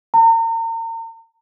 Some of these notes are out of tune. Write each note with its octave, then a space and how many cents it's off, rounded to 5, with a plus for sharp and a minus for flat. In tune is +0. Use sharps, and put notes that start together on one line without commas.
A#5 -40